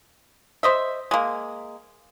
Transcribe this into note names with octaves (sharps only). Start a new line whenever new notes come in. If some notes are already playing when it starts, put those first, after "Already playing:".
C5 D#5 E5
G#3 A#3